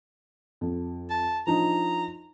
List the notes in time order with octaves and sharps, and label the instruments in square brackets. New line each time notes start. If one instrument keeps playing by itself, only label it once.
[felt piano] F2
[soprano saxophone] A5
[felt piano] F3 D4 D#4 [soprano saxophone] A#5